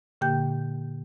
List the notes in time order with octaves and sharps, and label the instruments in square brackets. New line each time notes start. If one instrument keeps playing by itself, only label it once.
[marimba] A#2 D3 A#3 G4 G5 G6